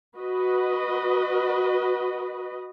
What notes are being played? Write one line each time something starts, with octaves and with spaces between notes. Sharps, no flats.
F#4 B4 D#5